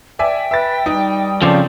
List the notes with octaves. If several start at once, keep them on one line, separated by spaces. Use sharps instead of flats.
D5 E5 G5 G#5
B4 E5 A6
G3 D#4
C#3 F3 C4 A4 D5